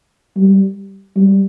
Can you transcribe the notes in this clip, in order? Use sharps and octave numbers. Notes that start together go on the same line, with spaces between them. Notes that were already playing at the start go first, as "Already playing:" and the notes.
G3
G3